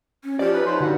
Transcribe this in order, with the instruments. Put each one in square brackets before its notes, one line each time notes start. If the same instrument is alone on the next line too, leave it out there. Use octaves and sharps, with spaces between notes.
[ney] C#4
[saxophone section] F3 C#4 A4 [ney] G4 [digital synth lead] D5
[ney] D#4 [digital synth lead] B4
[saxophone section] F4 C5 C#5
[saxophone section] G2 F#4 [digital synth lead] D3